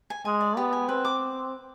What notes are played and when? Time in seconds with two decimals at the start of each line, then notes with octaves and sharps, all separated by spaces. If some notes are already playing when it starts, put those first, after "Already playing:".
0.10 G#5
0.25 G#3 G#5
0.41 D5
0.57 B3 G4
0.73 G#5
0.88 C4 B4
1.05 D6